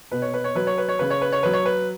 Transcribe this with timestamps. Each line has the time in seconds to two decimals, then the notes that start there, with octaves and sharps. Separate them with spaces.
0.11 B2 B4
0.22 C#5
0.34 B4
0.44 C#5
0.55 F#3 B4
0.67 C#5
0.78 B4
0.89 C#5
0.99 C#3 B4
1.10 C#5
1.21 B4
1.32 C#5
1.43 F#3 B4
1.53 C#5
1.65 B4